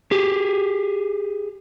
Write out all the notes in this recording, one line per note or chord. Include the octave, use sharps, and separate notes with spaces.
G4 G#4